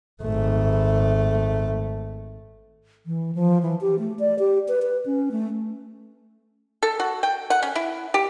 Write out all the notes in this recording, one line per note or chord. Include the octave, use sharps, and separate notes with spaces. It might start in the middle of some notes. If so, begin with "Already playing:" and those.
G#1 A3
E3
F3
E3
G4
A3
D5
G4
B4
B4
C#4
A3
A4
F#4
G5
F#5
C#4
E4
G4